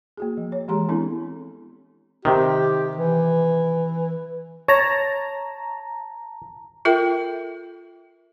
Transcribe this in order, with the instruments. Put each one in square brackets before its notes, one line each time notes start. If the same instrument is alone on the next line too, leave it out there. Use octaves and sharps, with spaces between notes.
[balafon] A#3 F#4 G#4
F3
C#5
E3 G#3 G4 G#4 A#5 C6
B3 C4 D4 E4 A4
[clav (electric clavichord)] C3 D#3 [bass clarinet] G4
[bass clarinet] E3
[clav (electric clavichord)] C#5 [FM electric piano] A5 A#5
[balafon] F4 A4 A#4 E5 G5